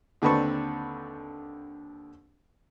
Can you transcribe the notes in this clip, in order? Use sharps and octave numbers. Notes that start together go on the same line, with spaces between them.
D#2 D3 C4 B4 A5 C#6